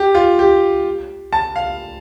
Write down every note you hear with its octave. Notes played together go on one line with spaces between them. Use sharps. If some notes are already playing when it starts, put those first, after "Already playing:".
Already playing: G4
F4
G4
A5
F5